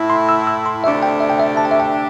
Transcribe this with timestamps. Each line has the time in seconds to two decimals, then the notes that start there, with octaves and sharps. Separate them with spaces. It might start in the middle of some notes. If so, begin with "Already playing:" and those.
Already playing: A2 A3 E4
0.10 C6
0.29 E6
0.47 E6
0.66 C6
0.84 D2 C3 A3 D4 G4 E5
1.03 G5
1.20 E5
1.30 G5
1.40 E5
1.57 A5
1.65 G5
1.71 E5
1.80 G5